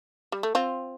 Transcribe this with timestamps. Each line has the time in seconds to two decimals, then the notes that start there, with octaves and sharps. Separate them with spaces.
0.32 G3
0.43 A3
0.55 C4 F4